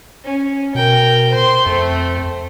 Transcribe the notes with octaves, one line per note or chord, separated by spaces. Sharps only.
C#4
B2 A#4 G5
C5 C6
F2 A3 C4